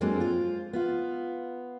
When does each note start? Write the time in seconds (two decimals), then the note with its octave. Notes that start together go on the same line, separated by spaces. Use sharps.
0.01 F2 F#3 G#3 A#3 C4 D4
0.20 F4 C5
0.73 B3 F4 F5